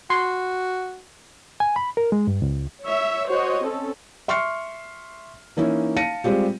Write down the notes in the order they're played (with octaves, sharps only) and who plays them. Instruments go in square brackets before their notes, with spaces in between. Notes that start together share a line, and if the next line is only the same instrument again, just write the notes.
[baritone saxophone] F#4 [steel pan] C6
[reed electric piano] G#5
B5
A#4
G#3
G2
C#2
[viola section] C#5 E5
F#4 C5 C#5 D#5
C4 C#4 A4
[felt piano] E5 C6 C#6 F6 C7 C#7
E3 A#3 C#4 D#4 E4
F5 A5 A#6 C#7 D#7
G3 G#3 C4 F4 G4